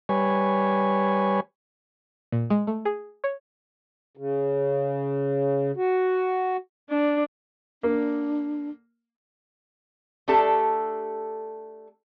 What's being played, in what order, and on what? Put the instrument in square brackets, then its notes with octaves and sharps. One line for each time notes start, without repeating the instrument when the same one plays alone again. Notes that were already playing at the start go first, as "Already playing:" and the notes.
[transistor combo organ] G3 B4 C#5 G#5
[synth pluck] A#2
G#3
A3
G#4
C#5
[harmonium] C#3
F#4
[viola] D4
[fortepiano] A#3 [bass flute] D4
[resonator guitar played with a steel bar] A3 D4 G4 A4